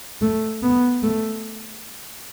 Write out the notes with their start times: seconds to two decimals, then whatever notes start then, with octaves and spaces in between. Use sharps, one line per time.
0.22 A3
0.62 B3
1.03 A3